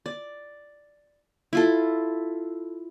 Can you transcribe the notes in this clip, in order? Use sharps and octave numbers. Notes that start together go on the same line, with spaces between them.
D5
E4 F4 A4